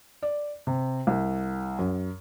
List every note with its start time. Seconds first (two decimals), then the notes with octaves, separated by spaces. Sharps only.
0.22 D5
0.67 C3
1.07 C2
1.79 F#2